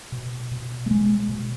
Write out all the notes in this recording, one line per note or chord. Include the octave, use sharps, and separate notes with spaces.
B2
B2
A3
B2 G#3
B2